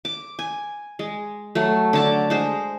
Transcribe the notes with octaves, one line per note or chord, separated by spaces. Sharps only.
D6
G#5
G#3
F#3 A3
D3 A5 D6
G#3 C5